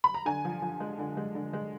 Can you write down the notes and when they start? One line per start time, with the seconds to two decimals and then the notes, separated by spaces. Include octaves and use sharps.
0.04 B5
0.14 A#5
0.26 D3 G#5
0.45 F3
0.62 F3
0.80 G#3
0.98 D3
1.17 G#3
1.35 D3
1.53 G#3